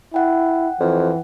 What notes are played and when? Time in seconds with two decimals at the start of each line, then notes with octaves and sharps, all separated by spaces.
0.14 E4 F#5 G5
0.80 F2 E3